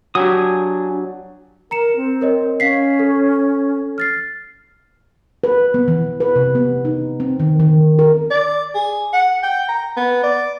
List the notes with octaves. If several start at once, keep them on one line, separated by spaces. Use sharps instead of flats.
F#3 D4 G4 G#5 D#6
A#4 A#5 C#7 E7
C4
A#4 C#5 D#5
C#4 F5 B6 C7
A4
F6 A6 C7
B4
B3
E3
B4
C3
B3
D#4
C4
D#3
D#3
A#4
D5
G#4
F#5
G5
A#5
B3
D5